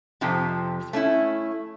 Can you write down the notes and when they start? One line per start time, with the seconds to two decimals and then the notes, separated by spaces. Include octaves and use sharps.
0.21 F2 C3 F3
0.93 A3 C#4 E4